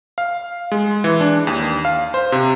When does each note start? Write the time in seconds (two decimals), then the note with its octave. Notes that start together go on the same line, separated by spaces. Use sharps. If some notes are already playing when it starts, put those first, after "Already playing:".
0.18 F5
0.72 G#3
1.04 E3
1.21 D4
1.47 D#2
1.85 F5
2.14 C5
2.32 C3